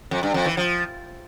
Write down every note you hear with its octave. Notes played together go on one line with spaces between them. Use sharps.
F2
G2
F2
E3
F3